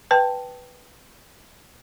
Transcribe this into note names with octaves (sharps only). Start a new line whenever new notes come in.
B4 G5 A5